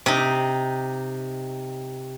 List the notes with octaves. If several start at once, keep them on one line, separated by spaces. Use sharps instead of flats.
C3 D#4